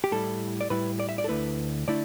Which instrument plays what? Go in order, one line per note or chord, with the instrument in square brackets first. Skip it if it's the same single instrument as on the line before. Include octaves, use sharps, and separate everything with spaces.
[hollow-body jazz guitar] G4
A2 G3 E4 A4
D5
A2 G3 E4 B4
D5
E5
D5
A4
D2 D3 A3 E4 B4
D3 A3 E4 D5